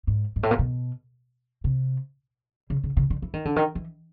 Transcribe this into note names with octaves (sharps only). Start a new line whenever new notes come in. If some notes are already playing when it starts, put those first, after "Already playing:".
G#2
G#2
A2
A#2
B2
C3
C#3
C#3
C#3
D3
E3
D#3
D3
D#3
E3